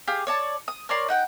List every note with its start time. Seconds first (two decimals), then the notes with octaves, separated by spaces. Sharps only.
0.07 G4 G#4 F5
0.27 C#5 D5 A5
0.68 D#6
0.89 A#4 C#5 D5 C6
1.08 D#4 F#5 G5